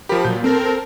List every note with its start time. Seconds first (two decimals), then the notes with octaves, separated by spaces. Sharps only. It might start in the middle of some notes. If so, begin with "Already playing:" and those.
0.09 F3 G4 A#4 B5
0.25 A#2 F#3 G6
0.44 C4 A4 A#4